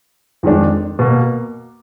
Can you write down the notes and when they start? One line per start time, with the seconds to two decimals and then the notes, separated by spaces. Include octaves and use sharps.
0.43 F2 D#3 G#3 D4
0.99 B2 A#3